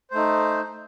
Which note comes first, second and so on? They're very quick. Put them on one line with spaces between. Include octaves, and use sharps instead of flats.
C5 A3 D#4